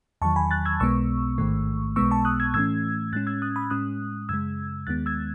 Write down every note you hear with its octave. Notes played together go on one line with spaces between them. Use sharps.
E2 D#3 F#3 A5 C#6
G#5 B5
F#6 A6
E6 G#6
B1 B2 G#3 B3 C#6 E6
A1 G#2 D#3 A3
B1 B2 G#3 B3 C#6 E6
A5 C#6
D#6 F#6
E6 G#6
A2 E3 A3 C#4 E6 G#6
A2 G#3 C#4 F#6 A6
E6 G#6
D#6 F#6
B5 D#6
A2 G#3 C#4 D#6 F#6
F#2 C#3 G#3 E6 G#6
D#2 D#3 G#3 B3 F#6 A6
E6 G#6